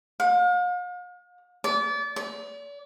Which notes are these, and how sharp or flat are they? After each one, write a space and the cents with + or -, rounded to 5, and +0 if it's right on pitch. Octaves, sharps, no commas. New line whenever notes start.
F5 +45
D5 -30
D5 -45